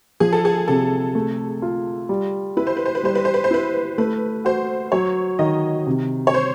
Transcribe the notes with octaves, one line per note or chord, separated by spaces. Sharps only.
F3 G#4
A4
G#4
C3 A4
A3
F4
G3
E4 B4
C5
B4
C5
B4
G3 C5
B4
C5
B4
C5
E4 B4
A3 B4
F#4 C5
F#3 C#5
D#3 D#5
C3
C#5
C5